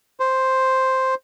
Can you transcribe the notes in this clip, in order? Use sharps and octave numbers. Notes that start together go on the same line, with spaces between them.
C5